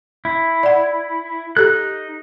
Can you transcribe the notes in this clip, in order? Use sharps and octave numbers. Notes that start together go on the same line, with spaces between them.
E4
D5 F#5
D#4 G4 A4 F#6